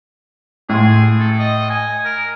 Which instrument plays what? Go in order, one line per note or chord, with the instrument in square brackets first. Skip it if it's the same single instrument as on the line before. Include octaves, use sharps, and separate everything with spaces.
[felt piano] A2 C6 [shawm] G#4
[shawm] A4
D#5
G#5
A#4